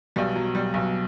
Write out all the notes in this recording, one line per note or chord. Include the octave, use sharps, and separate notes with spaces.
B1 B2 G3
F#3
G3
B1 B2